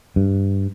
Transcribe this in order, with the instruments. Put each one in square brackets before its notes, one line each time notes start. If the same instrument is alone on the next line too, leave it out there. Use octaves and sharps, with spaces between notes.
[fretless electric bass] G2